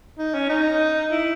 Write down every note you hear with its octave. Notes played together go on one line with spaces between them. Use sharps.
D#4
C#4
D#4
E4